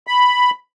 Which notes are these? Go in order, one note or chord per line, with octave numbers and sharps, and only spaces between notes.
B5